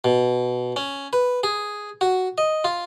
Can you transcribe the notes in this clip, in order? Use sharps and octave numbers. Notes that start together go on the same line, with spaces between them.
B2
C#4
B4
G#4
F#4
D#5
F4